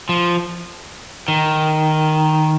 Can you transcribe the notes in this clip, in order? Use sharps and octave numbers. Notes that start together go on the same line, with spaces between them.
F3
D#3